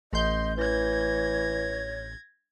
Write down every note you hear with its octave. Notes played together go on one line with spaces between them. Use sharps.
A1 D#5 C6 G6
E3 C#5 G#6 A#6